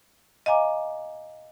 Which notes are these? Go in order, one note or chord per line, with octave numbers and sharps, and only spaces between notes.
D#5 F5 G#5 A#5 D6